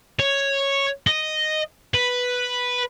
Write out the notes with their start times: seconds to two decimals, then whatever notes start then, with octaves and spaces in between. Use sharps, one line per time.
0.19 C#5
1.07 D#5
1.94 B4